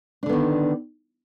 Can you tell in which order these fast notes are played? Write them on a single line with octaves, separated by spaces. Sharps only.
D4 D3 B3 D#3